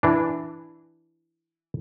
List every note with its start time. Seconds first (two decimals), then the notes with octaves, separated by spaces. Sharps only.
0.03 E3 D4